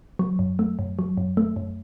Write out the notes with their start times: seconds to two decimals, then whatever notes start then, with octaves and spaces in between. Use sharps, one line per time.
0.19 F#3
0.39 F#2
0.59 A3
0.79 F#2
0.99 F#3
1.17 F#2
1.37 A3
1.56 F#2